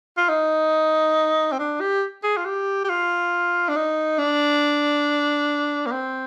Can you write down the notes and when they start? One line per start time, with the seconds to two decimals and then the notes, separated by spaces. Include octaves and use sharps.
0.17 F4
0.29 D#4
1.52 C4
1.59 D4
1.81 G4
2.23 G#4
2.37 F4
2.45 G4
2.84 G4
2.89 F4
3.69 D4
3.76 D#4
4.18 D4
5.87 A#3
5.92 C4